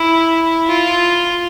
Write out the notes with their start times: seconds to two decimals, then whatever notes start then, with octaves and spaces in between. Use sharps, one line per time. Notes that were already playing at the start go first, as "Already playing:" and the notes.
Already playing: E4
0.68 F4